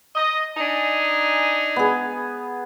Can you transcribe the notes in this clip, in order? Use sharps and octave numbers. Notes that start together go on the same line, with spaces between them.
D#5
D4 D#4 G#5
B3 G#4